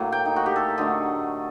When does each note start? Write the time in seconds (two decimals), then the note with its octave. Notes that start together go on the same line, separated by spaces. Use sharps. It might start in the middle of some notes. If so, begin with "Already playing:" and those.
Already playing: A2 F#3 A#3
0.12 G5
0.25 D#4
0.36 F#4
0.46 G4
0.56 A4
0.78 D3 F#3 A3 D#5